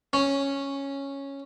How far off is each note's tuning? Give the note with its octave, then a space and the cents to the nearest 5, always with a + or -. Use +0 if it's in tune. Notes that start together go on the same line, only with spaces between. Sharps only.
C#4 -5